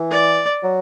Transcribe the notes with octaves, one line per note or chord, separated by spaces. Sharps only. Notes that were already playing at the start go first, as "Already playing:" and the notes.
Already playing: E3
D5
F#3